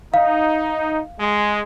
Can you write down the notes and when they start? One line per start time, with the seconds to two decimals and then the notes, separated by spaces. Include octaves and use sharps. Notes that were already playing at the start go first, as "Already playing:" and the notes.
0.14 D#4 F5
1.19 G#3